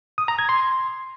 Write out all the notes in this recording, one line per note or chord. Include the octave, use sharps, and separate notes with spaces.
D#6
A#5
G#6
C6